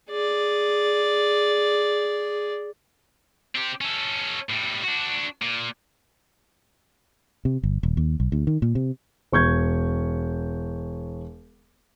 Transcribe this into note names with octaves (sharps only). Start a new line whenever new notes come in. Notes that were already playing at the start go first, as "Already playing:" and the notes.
G#4 D5
C4 G4
C#4 A4
A2 G3
D4 F#4
A#2
C3
G1
D#1
D#2
B1
D2
D#3
A#2
C3
E1 C#6 G6 G#6